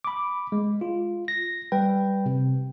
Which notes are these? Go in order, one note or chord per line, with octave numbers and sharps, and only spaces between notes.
B5 D6
G#3
F4
A#6
G3 B4 G5
C3